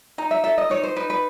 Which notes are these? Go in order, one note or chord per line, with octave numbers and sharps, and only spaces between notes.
D#4 A#5
E5
A4 E5
D#5
D#4 C#5
C5
D#4 B4
B4